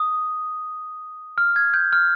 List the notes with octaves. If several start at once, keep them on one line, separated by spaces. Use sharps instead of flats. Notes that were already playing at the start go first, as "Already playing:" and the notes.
Already playing: D#6
F6
G#6
G6
F6